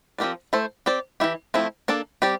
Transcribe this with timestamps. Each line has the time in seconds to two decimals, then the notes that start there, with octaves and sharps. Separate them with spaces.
0.18 F3 C4 G4 A#4 D5
0.53 A3 E4 A4 C5
0.86 C4 G4 D5
1.20 E3 A#3 E4 G4
1.54 F3 A3 C4 E4
1.88 A#3 D4 A4 D5
2.22 G3 C4 G4 D5